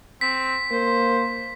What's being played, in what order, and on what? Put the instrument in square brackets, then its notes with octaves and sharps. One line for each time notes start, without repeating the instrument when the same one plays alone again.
[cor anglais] C4 [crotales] B6
[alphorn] A#3 [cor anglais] C5